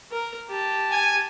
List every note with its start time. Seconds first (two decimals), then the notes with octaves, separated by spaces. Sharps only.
0.12 A#4
0.49 G4 A5
0.91 G#5